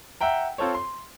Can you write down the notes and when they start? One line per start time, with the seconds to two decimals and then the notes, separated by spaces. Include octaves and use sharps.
0.21 E5 F#5 G5 A#5
0.58 C4 F4 A4 C5 C#5
0.75 C6